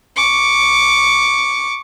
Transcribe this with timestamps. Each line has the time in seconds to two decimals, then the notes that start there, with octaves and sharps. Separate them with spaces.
0.16 C#6 D6